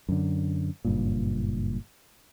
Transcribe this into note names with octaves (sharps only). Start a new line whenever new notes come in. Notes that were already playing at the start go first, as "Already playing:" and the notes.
F#2 D3
F#1 G2 A#2